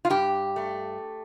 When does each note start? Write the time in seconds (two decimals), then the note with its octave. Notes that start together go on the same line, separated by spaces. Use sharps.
0.05 F4
0.10 G2 G4
0.56 A3